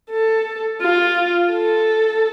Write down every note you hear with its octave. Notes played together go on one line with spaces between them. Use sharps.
A4
F4
A4